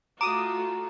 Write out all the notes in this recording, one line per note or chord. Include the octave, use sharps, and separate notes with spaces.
A3 F4 F#4 A#5 D6 D#6